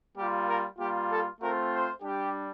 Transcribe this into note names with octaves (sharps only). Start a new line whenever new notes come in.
G3 A#3 F4 G4
A#4
G3 A#3 F4 G4
A4
A3 C4 F4 A#4
C5
G3 D4 G4